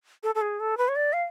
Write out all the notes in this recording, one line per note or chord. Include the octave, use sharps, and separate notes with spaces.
A4
A4
G#4
A4
B4
C#5
D5
F5